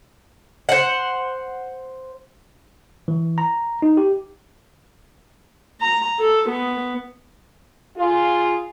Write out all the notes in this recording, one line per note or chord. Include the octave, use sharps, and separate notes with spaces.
C5 F#5
E3
A#5
D#4
G4
A#5
A4
B3
F4 G#4